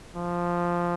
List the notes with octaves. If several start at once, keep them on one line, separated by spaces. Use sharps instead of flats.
F3